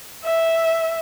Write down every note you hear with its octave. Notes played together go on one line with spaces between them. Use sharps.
E5